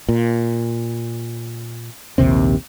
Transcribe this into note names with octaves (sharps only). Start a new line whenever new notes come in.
A#2
A#1 D#2 C3 C4